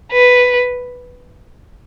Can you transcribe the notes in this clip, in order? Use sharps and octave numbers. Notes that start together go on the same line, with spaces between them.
B4